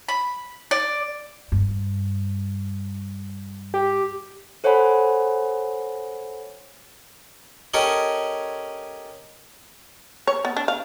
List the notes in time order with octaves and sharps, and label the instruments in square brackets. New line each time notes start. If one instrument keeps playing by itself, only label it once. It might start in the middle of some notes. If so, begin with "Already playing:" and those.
[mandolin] B5
D5
[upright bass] G2
[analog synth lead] G4
[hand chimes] A4 C5 C#5 F#5 G#5 B5
[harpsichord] C#4 G4 A4 A#4 C#5 D#5
[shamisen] C#5
B3
D4
F5